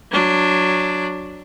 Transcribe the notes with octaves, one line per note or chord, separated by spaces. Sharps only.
F#3 D4